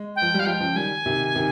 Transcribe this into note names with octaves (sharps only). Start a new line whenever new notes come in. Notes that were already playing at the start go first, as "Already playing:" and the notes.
Already playing: G#3
G5
F3
G3 F5
F3 G#3 G5
C#3 F3
D#3 G3 G#5
C3 D#3
C3 D#3